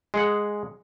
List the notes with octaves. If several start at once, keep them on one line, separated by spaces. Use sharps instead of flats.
G#3 G#4 F#5